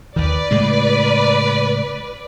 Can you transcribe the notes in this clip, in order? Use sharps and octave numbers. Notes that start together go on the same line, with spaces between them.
D#2 D#3 B4 D5
A2 C#3 G#3